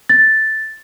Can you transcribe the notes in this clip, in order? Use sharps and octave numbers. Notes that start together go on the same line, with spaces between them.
A6